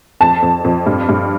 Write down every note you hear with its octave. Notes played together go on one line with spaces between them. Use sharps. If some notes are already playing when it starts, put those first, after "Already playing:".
F2 A5
F2
F2
G2
G2